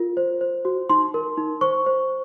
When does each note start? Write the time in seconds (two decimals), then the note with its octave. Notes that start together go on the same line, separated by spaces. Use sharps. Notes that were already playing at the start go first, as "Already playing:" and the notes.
Already playing: F4 A#4
0.17 C5
0.41 C5
0.65 F#4
0.89 D#4 C6
1.14 A#4
1.38 D#4
1.61 C5 C#6
1.86 C5